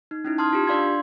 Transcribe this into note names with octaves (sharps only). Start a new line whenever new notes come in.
D#4
C#4 D#4 E4
A5 C6 D#6 F6 G#6
F4 G4
D4 D5 F5 C6 G#6
D4